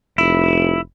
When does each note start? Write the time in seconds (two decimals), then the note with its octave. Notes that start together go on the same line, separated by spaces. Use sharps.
0.18 F1 E4